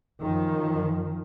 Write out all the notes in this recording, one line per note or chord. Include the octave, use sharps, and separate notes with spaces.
F#2 D#3 F3